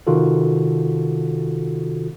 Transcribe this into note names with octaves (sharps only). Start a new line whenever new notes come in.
C3 D#3 F4 F#4 A4